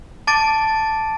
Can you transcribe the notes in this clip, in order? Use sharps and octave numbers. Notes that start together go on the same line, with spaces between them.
A5 D6 A6 D7